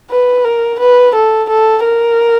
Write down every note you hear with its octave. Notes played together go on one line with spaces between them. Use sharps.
B4
A#4
B4
A4
A4
A#4